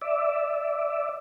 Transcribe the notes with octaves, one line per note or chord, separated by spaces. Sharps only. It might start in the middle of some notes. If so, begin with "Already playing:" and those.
D5 E5